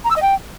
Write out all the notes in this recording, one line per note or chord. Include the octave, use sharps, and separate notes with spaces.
A#5
E6
D#5
G5